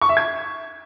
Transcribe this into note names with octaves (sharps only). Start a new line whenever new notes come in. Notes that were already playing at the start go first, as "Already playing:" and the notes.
C#6
E5
G#6